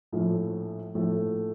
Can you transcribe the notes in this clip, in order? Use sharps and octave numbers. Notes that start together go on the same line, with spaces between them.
A#1 A2 F3 A3
A#1 A2 F3 A3